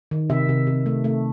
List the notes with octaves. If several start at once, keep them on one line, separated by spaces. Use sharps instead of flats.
D#3
C3 E5
C3
C3
A3
A3